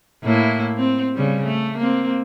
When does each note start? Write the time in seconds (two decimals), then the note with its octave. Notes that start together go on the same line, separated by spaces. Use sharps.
0.24 A2 A#3 E4
0.78 C4
1.15 C#3 G3
1.45 A3
1.77 A#3 C4